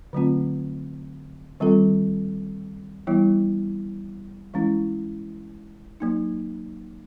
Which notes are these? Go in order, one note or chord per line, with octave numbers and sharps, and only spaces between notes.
D3 F#3 A3 C4 F4
D#3 G3 C4 F4 A4
E3 G3 B3 E4
E3 G#3 C#4 E4
F#3 A#3 D#4